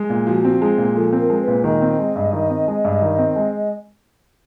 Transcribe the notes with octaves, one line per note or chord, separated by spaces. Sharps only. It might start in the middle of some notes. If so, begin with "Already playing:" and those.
Already playing: G#3
A#2
F3 F#4
C4
G#3 G#4
A#2
F3 A4
C4
A#4
G#3
B4
A#2
D#3 D#5
C4
G#3
G2
D#3
C4
G#3
G2
D#3
C4
G#3